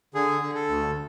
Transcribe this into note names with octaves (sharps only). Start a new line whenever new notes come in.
D3 G#4
D3
A4
D2